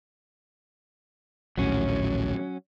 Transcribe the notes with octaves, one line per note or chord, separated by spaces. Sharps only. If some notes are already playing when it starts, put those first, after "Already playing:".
A#1 D#2 A2 F#3 C#4